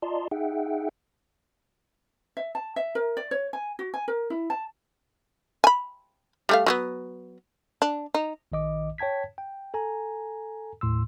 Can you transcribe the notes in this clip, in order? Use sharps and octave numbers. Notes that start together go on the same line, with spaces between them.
F4 D5 D#5 A5 A#5 C6
D#4 G#4 E5 F#5 G5
E5
A5
E5
A#4
D5
C#5
G#5
F#4
G#5
A#4
E4
A5
G#5 B5
G3 A3 F5
F#3 G#3 B3
D4
D#4
A#1 D#3 D#5 D6
C#5 G5 A5 G#6 B6
G5
A4 G#5 A#5
D#2 A2 C6 E6